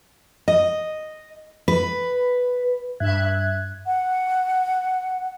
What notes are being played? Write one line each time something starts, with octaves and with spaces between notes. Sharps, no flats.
D#5
B4
G2 E5 F#6 G#6
F#5